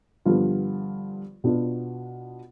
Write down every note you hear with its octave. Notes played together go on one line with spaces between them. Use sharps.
G2 D3 F3 B3 F4
B2 B3 D4 F4